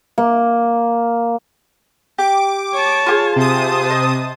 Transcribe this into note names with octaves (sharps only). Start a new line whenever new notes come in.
A#3
G4 D6
C#5 A5
F4 G4 G#4
C3 C5 A5 D#6
D#5